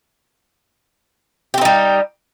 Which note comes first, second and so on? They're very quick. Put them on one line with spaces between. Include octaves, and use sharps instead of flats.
G4 C4 D#4 G3